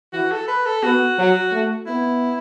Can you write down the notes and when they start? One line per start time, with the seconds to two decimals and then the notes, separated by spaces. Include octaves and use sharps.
0.13 E3 F#4
0.32 A4
0.48 B4
0.66 A4
0.83 B3 F#4
1.19 F#3
1.52 A3
1.87 B3 E4